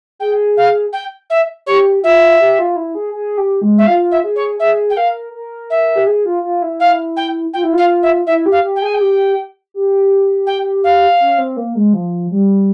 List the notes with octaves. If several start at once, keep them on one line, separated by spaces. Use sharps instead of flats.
G#4 G5
F5
G5
E5
G4 C#5
F4 E5
G4
F4
E4
G#4
G#4
G4
G#3
E5
F4 F5
E5
G#4
C#5
G#4 E5
G5
A#4 F5
A#4
E5
G4
G#4
F4
F4
E4
F5
G5
F4 G5
E4
F4 F5
E5
E4 E5
G4
F5
G4
G5
G#4 G#5
G5
G4
G4
G5
F5
C#4
C4
A#3
G#3
F3
G3